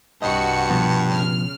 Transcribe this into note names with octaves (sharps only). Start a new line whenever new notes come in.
C2 G2 F#4 D#5 C#7
B2 F3 B3
C#3 F6